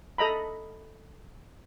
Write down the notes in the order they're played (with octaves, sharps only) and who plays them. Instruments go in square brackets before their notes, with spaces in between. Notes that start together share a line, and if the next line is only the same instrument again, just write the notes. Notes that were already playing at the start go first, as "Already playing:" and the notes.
[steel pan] A4 D#5 A#5 B5